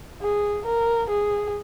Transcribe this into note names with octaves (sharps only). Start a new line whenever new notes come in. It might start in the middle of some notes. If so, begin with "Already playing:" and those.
G#4
A#4
G#4